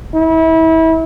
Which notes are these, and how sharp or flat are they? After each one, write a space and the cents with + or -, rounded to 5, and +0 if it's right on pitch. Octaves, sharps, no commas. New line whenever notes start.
E4 -30